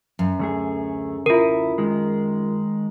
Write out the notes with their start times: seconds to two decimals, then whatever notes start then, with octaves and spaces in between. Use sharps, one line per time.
0.19 F#2
0.39 D2 A3 G#4
1.26 D2 E4 F4 A#4
1.78 D#3 G#3